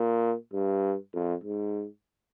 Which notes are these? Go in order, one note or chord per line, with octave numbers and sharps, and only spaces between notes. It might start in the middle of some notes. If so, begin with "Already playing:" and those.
Already playing: A#2
G2
F2
G#2